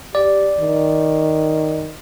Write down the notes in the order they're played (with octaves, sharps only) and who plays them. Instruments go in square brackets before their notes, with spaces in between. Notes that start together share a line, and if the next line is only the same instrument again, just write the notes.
[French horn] G4 [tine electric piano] D5
[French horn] D#3